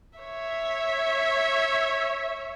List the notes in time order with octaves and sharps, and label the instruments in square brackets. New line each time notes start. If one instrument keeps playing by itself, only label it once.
[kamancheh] C#5 E5